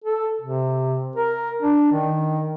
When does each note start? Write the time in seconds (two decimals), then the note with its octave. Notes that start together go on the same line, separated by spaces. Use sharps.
0.04 A4
0.41 C3
1.16 A#4
1.62 D4
1.92 D#3